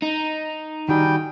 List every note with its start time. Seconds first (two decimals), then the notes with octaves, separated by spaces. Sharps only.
0.02 D#4
0.89 D#3 G3 F#4 G#4 G5